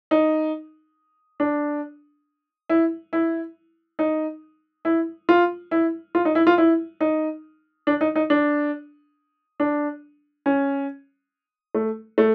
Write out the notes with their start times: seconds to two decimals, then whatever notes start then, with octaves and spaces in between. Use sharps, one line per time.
0.11 D#4
1.40 D4
2.69 E4
3.13 E4
3.99 D#4
4.85 E4
5.29 F4
5.71 E4
6.15 F4
6.25 D#4
6.35 E4
6.47 F4
6.58 E4
7.01 D#4
7.87 D4
8.01 D#4
8.16 D#4
8.30 D4
9.60 D4
10.46 C#4
11.75 A3
12.18 A3